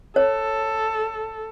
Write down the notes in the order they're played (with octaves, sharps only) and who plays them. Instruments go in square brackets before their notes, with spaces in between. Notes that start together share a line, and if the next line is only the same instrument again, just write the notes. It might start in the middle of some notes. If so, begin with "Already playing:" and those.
[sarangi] A4 [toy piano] C#5